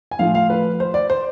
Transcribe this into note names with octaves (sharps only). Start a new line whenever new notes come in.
G#5
A2 F3 A3 F5
F5
B4
C5
D5
C5